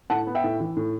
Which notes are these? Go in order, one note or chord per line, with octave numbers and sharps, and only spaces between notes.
A2 F#5 A5
B3
E5 G5
A2
E3
A2